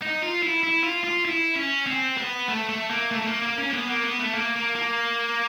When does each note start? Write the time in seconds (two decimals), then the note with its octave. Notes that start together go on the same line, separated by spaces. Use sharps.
0.02 D#4
0.22 F4
0.43 E4
0.64 E4
0.84 F4
1.04 F4
1.25 E4
1.55 C#4
1.87 C4
2.17 B3
2.48 A3
2.69 A3
2.90 A#3
3.11 A3
3.22 A3
3.27 A#3
3.42 A#3
3.58 C#4
3.69 A#3
3.74 B3
3.88 A#3
4.03 B3
4.20 A3
4.34 A#3
4.56 A#3
4.76 A#3